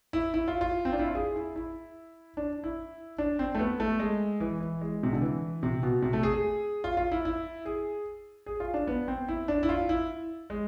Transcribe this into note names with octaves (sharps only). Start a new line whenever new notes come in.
E4
E4
F4
F4
C4
D4
E4
F4
G#4
E4
E4
D4
E4
D4
C4
A3
B3
A3
G#3
E3
E3
G#3
C3
D3
E3
C3
B2
C3
A3
G#4
G#4
F4
F4
E4
E4
G#4
G#4
F4
D4
B3
C4
E4
D4
E4
F4
E4
G#3